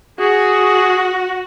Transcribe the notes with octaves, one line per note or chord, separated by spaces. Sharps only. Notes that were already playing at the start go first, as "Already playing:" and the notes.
F#4 G#4